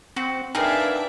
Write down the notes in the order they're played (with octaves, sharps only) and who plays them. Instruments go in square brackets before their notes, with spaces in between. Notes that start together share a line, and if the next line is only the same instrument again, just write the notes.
[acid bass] C4 [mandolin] F#4
[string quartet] D4 E5 [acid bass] D#4 [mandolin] G#4 A#4 F5 [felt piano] B4 G5